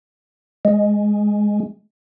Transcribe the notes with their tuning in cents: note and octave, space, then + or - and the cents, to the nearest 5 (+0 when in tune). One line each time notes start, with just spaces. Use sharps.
G#3 +0